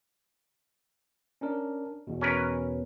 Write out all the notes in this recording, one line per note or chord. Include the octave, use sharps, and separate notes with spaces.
C#4 D4 A#4
E2 B2
C#4 A#4 B4